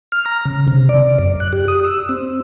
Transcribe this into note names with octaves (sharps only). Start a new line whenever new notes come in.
F6
A#5
C#3
C3
D5
F#2
F#6
G4
D#6
E6
C4